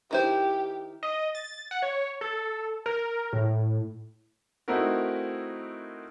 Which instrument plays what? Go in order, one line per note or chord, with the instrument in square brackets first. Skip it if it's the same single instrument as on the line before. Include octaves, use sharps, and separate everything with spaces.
[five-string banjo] D#3 E4 C5 [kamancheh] G4
[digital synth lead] D#5
A6
F#5
C#5
A4
A#4
A2
[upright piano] A3 C4 D#4 E4 F#4 A#4